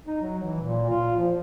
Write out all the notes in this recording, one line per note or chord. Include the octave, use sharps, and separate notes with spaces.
D#4
F#3
E3
A#2
F4
F3